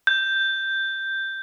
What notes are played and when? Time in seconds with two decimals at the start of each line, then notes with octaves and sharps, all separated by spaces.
0.07 G6